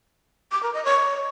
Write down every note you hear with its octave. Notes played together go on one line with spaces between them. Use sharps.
D6
A#4
D#5
C#5